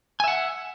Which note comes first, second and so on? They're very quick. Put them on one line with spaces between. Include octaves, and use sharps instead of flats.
G#5 E5 F#5